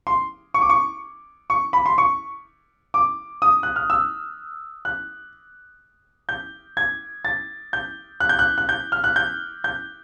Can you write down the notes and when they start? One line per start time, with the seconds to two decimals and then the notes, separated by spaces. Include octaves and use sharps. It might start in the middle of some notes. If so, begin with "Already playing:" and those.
0.07 C6
0.54 C#6
0.62 D6
0.70 C#6
1.50 C#6
1.73 B5
1.86 C6
1.98 C#6
2.94 D6
3.42 D#6
3.63 F#6
3.76 F6
3.90 E6
4.85 F#6
6.29 G6
6.77 G#6
7.25 A6
7.73 G6
8.20 F#6
8.29 G6
8.39 F#6
8.58 F#6
8.69 G6
8.92 F6
9.04 F#6
9.16 G6
9.64 G6